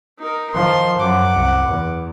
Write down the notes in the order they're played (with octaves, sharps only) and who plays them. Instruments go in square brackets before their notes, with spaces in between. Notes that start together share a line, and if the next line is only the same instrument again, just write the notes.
[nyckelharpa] D#4 A#4
[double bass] D#3 F3 [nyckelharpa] C6
[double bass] F#2 [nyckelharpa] F#5 D6
[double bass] C2
E2